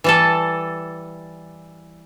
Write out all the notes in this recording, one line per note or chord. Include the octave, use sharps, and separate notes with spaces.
E3 G3 A4